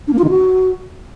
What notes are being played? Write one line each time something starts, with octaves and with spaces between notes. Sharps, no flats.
D4
A#3
F4
D#3
F#4